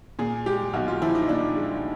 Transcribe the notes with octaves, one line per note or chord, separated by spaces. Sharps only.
A#2 G#4
G#3 G4
B1 F#4
F4
F3 E4
D#4
A#2 D4
G#3